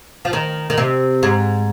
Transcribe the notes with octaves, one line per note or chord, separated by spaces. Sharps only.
F3
D#3
D#3
C3
G#2